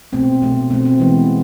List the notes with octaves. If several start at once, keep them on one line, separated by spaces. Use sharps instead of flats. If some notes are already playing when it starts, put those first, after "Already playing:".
B2 A3 C4
B2 A3
B2 A3 C4
C4
E3 G#3 B3